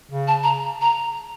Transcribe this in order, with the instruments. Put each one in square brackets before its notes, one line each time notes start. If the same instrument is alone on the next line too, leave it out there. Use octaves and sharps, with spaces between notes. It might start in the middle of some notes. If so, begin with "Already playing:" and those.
[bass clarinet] C#3
[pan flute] A5
A#5
A#5